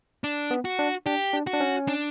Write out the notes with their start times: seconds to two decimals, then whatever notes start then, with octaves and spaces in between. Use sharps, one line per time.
0.24 D4
0.51 B3
0.65 F#4
0.79 D4
1.06 D4 G4
1.33 D4
1.47 F#4
1.53 D4
1.60 C#4
1.88 D4